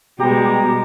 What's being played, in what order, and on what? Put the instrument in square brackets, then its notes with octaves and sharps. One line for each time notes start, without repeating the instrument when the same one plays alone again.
[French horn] B2 [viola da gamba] G3 G#3 [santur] G4 C6 [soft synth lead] A#5